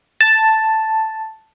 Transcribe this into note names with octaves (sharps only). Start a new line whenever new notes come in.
A5